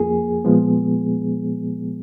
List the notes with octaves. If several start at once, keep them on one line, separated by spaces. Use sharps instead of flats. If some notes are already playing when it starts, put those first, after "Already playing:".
Already playing: F2 F3 A#3 G#4
A#2 F3 G#3 B3